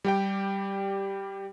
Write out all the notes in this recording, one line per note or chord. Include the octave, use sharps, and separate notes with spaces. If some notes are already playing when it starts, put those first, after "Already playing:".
G3 G4 G5